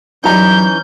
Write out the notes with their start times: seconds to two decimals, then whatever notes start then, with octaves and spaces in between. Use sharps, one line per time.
0.24 F#2 E3 G3 C#4 D#4 A#5 G6